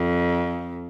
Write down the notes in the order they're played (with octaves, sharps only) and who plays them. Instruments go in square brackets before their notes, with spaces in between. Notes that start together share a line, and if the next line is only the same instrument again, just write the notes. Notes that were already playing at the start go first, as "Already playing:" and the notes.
Already playing: [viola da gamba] F2